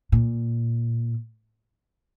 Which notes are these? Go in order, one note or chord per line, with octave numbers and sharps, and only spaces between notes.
A#2